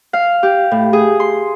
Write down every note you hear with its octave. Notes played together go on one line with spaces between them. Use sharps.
F5
G4
A2
G#4
C6